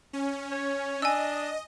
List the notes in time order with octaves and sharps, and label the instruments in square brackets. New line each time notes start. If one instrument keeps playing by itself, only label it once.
[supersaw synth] C#4
[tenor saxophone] C#5
[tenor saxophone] D4 [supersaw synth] D#5 [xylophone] G#5 E6